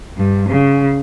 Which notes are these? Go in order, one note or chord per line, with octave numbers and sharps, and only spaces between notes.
G2
C#3